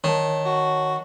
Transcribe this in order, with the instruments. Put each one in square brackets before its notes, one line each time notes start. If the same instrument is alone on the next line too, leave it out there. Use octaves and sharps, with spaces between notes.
[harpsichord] D#3 [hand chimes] C#5 A5
[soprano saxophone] F#4